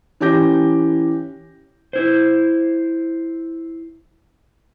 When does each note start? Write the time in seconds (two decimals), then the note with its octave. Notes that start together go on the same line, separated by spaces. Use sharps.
0.21 E3 C#4 G4 D6 G6 A#6
1.93 E4 C5